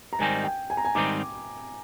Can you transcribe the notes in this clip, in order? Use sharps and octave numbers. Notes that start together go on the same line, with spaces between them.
A#5
G#2 D#3 G3 C4 D#4 G#5
G5
G#5
A#5
G#5
G#2 D#3 G3 C4 D#4 D6